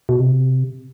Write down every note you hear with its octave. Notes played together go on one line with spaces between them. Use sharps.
B2
C3